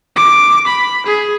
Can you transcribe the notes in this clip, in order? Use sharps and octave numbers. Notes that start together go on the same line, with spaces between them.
D6
B5
G#4